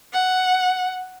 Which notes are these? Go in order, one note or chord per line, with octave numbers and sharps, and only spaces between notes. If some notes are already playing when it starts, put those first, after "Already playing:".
F#5